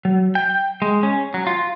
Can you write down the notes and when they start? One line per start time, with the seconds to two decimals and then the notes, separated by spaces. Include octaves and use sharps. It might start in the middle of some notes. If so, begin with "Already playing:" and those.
0.05 F#3
0.35 G5
0.82 G#3
1.03 C#4
1.34 F#3
1.47 F4